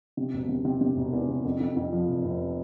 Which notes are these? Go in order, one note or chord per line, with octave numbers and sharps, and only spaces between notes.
C3
E1
C3
C3
C3
E1
E2
C3
F2
F2
F2
F3
F1
F1